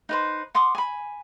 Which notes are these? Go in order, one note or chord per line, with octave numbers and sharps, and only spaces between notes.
D#4 B4 C5
F#5 C6 D6 D#6
G#5 B5